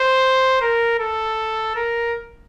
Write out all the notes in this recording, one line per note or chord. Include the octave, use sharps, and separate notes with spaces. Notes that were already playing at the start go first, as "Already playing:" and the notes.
Already playing: C5
A#4
A4
A#4